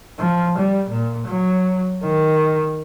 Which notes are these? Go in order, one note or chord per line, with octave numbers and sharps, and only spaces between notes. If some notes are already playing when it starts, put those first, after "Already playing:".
F3
G3
A#2
F#3
D#3